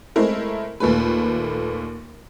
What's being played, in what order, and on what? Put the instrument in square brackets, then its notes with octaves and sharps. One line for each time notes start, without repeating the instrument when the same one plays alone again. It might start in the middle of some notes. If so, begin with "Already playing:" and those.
[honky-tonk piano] G#3 A3 C4 E4 A#4
D#2 A#2 A3 B4